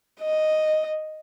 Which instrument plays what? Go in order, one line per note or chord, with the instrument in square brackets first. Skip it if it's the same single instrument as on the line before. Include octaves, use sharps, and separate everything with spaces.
[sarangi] D#5